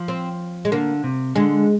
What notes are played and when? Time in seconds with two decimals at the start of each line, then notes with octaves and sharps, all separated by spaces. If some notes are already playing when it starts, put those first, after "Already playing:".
Already playing: F3
0.08 C4
0.65 G#3
0.72 D3 A#3
1.04 C3
1.36 D3 G#3